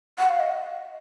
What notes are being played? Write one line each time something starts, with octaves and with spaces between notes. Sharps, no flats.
F#5
F5
D#5